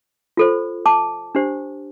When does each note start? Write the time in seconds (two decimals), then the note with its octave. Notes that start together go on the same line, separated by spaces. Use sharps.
0.37 F4 A4 C5
0.86 A5 D6
1.35 D4 G4 C5